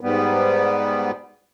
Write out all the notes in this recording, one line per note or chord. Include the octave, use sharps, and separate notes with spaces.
G#2 G3 B3